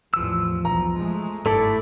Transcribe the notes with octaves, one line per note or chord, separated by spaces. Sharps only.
A1 E2 F3 E6
B1 E2 A#5
G#3 A3
G1 G#2 A3 E4 A4 D5